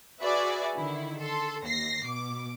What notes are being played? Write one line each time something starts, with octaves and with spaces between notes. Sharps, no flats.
F#4 G#4 B4 D5 E5 G#5
D3 D#3 E4
A4 C6
D#2 A#6 C7
B2 D6